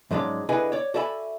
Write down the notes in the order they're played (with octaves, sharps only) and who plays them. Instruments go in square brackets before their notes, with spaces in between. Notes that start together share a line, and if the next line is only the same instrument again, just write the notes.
[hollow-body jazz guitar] G#2 F3 F#3 G#3 C#4 D5
D3 E4 G#4 B4 D#5 G#5
C#5 D5
F#4 A4 D5 E5 G#5 B5